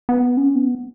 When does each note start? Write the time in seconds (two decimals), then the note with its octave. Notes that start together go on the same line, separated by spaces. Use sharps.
0.09 B3
0.37 C#4
0.55 B3